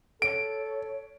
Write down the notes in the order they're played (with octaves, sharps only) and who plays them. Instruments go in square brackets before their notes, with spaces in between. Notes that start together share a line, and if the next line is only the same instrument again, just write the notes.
[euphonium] A4 [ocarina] C#5 [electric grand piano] D7